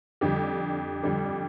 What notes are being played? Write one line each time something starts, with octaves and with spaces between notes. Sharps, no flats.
F2 D3 G3 G4
F2 D3 G3